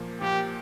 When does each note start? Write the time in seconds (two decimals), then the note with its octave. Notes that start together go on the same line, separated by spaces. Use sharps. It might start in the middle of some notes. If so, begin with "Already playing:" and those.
Already playing: A#2 F3 A#3
0.21 A#2 F3 A#3 G4